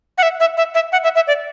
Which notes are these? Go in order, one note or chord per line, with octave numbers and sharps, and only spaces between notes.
F#5
E5
E5
E5
E5
F#5
E5
E5
D5